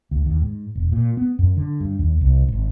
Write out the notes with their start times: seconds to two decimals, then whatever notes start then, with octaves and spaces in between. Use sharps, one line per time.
0.11 D2
0.26 D#2
0.42 G#2
0.75 E1
0.92 A#2
1.17 B3
1.39 F#2
1.57 D3
1.80 G2
1.99 D#2
2.21 C2
2.48 G#1